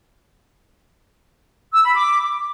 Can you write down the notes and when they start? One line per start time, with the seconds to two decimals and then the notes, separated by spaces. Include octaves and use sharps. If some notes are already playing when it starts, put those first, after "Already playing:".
1.73 E6
1.85 B5
1.96 D6